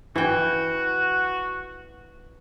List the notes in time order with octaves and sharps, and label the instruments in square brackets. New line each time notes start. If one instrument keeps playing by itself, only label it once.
[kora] E3 G5 [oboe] F#4